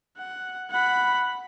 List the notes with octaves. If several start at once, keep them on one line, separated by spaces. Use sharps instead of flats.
F#5
F#5 B5